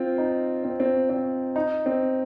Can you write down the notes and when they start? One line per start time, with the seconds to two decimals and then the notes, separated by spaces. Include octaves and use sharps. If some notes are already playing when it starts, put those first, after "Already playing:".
Already playing: C4 F4
0.18 D#4
0.64 C4
0.80 C4
1.10 C4
1.56 D#4
1.86 C4